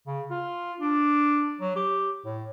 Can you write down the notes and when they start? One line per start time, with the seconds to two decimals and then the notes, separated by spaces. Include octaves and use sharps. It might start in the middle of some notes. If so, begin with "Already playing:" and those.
0.07 C#3
0.31 F4
0.80 D4
1.61 F#3
1.76 G4
2.25 A2